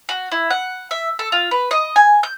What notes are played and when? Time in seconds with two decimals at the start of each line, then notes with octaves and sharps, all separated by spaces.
0.09 F#4
0.32 E4
0.51 F#5
0.91 E5
1.19 A4
1.32 F4
1.51 B4
1.71 D#5
1.96 G#5
2.23 G6